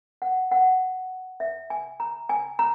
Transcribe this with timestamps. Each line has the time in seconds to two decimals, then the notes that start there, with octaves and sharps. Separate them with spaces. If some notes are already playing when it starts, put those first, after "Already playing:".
0.22 F#5
0.51 F#5
1.40 E5
1.70 G#5
2.00 A#5
2.29 G#5
2.59 A#5